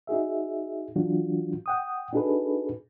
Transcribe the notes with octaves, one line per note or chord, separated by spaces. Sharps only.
D#4 F#4 G#4 E5
E3 F#3 D4 F4 F#4
F#5 G5 D#6
D4 D#4 F#4 G#4 A4 B4